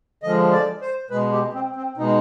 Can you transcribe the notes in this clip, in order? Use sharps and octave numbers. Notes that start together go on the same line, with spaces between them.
D3 F3 G#3 D#5
D5
C5
B2 G#3 B4
G4
C4
C4
B2 G#3 D#4